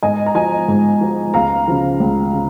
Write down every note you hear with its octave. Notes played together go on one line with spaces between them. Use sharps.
G#2 D#5 G#5
A#5
F3 D#5 G#5
G#2
F3
C#2 F5 A#5
C#3 F3
C#2
C#3